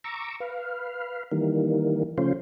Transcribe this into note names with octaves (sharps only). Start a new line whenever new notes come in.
A#5 C#6 D6 E6
B4 F5
D#3 E3 G3 A#3
C#3 F3 A3 C#4 F4 C5